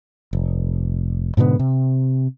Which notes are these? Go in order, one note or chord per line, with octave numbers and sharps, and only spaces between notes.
F1
G#2 B2 D3 B3
C3